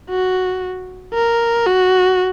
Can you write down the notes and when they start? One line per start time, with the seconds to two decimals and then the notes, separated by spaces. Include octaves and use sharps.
0.10 F#4
1.14 A#4
1.66 F#4